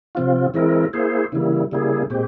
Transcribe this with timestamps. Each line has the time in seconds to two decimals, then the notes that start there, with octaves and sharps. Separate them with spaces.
0.15 C3 F3 C4 F4
0.54 E3 G#3 C4 E4 A#4
0.93 A#3 E4 G#4 C5
1.32 C#3 E3 G3 A#3 E4
1.71 C#3 G3 A#3 E4 G#4
2.10 A#2 G#3 C4 G4